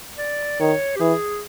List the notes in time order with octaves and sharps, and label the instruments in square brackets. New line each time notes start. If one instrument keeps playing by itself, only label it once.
[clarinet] D5
[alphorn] D#3 [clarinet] C#5
[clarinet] G4
[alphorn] E3 [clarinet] G#4